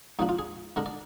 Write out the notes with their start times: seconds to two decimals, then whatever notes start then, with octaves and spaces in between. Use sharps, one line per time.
0.19 G#2 F3 A#3 D4 D#4
0.29 F4
0.39 G#4
0.76 D3 G#3 D4 A#4
0.86 D5